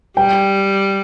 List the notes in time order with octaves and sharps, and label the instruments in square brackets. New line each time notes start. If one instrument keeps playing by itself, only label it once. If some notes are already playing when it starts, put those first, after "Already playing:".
[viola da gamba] G3 [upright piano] G5